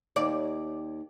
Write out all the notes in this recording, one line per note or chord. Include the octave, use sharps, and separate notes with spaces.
D#2 D5